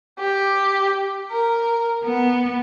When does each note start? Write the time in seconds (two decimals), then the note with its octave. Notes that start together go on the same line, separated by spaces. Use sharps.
0.19 G4
1.31 A#4
2.04 B3